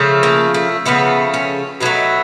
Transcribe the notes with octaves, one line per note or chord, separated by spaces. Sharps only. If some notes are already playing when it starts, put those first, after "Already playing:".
Already playing: C#3 F3 A3
A#3
A3
C#3 F3 A3 B3
C#4
B2 F#3 A3 D#4